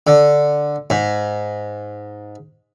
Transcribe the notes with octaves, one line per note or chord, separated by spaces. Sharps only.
D3
G#2